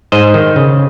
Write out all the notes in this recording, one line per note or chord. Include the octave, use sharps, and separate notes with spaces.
G#2 C5 D#5
D#3
C#3